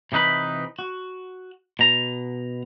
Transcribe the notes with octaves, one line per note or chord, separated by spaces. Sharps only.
C3 E3 D#4 B4 B5
F#4
B2 A#5